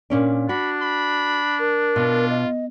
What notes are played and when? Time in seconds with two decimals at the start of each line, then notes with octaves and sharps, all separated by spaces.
0.10 A#2 C#4 D4
0.49 D4 F#4 B5
0.82 B5
1.59 A#4
1.96 B2 F4
2.30 D#5